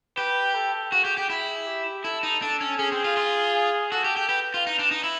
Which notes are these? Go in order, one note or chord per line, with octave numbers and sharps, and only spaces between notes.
G4 B4
A4
F#4 G#4
G4
G4
E4
G4
E4 A4
D#4
D4 A4
C#4
C#4 G#4
C4
F4
F4
F#4 A4
G4
G4
G4 B4
F4
D#4
D4
D#4
E4